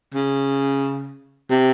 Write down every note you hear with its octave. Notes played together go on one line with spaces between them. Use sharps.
C#3
C3